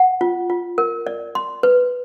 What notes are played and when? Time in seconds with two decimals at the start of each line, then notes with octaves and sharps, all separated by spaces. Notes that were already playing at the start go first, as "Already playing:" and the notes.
Already playing: F#5
0.21 F4
0.50 F4
0.78 A#4
1.07 D5
1.35 C6
1.63 B4